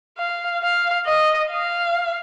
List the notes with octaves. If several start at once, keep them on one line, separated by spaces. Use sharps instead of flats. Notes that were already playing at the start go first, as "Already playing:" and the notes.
F5
F5
D#5
F5